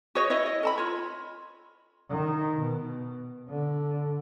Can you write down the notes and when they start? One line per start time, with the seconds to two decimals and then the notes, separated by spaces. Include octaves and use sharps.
0.15 F#4 G#4 C#5 D#5
0.30 E4 C#5 D#5
0.46 D#5
0.63 A4 A5 B5
0.78 F4 C#5
2.10 D#3
2.60 B2
3.49 D3